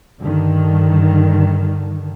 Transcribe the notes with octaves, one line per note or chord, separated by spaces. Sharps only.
G2 D3 D#3